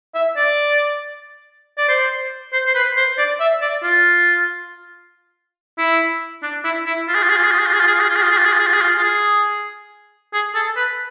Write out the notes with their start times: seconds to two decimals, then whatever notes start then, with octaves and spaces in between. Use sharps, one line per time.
0.15 E5
0.37 D5
1.78 D5
1.89 C5
2.53 C5
2.66 C5
2.75 B4
2.97 C5
3.18 D5
3.40 E5
3.62 D5
3.83 F4
5.78 E4
6.43 D4
6.64 E4
6.86 E4
7.08 F4
7.15 G#4
7.23 F4
7.30 G#4
7.37 F4
7.44 G#4
7.51 F4
7.59 G#4
7.66 F4
7.73 G#4
7.80 F4
7.87 G#4
7.94 F4
8.02 G#4
8.09 F4
8.16 G#4
8.24 F4
8.31 G#4
8.38 F4
8.45 G#4
8.53 F4
8.59 G#4
8.67 F4
8.74 G#4
8.81 F4
8.98 F4
9.03 G#4
10.33 G#4
10.55 A4
10.76 B4